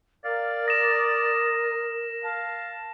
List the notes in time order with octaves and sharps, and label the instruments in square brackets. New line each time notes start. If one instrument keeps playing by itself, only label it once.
[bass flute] A#4 [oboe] D5 [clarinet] F5
[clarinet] D#6 [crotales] A#6 E7
[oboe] F5 [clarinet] A5